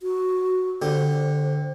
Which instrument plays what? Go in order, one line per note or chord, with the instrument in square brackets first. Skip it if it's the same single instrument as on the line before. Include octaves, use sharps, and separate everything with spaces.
[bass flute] F#4
[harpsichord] D3 G4 [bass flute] C5